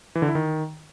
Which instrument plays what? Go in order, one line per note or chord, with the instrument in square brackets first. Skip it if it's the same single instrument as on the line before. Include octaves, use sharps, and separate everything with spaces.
[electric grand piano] E3
D3
E4
D#3